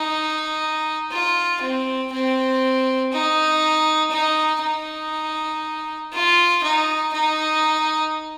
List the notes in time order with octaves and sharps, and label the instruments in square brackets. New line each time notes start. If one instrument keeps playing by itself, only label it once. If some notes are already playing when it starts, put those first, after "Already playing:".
Already playing: [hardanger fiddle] D#4
F4
C4
C4
D#4
D#4
D#4
F4
D#4
D#4